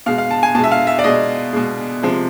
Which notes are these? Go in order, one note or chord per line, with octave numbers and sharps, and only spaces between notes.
B2 G#3 F5
F5
A5
G#5
B2 G#3 A5
E5
F5
E5
D5
B2 G#3 D#5
B2 G#3
C3 F3 G#3